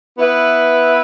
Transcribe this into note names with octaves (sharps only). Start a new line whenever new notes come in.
B3 E4 B4 E5